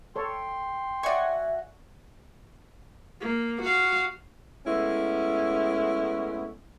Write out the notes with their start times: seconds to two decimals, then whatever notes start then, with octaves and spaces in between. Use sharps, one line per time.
0.16 A4 C#5 G5 C6
1.03 F#4 C#5 D5 E5 G#5 C#6
3.20 A#3
3.62 F#4 F5
4.65 G#3 A3 B3 C#4 E4